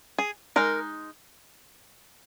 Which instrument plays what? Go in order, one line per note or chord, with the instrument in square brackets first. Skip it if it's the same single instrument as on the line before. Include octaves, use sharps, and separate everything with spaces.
[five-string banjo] G#4
G#3 D#4 A#4